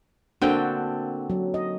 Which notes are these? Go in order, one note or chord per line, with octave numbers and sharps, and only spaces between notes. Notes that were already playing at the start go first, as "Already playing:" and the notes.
D3 A#3 C4 F#4 A4 G5
F#3
D#5